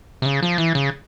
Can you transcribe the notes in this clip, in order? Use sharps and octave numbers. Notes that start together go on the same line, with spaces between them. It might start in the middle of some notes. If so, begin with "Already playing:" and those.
C3
C#3
F3
E3
C#3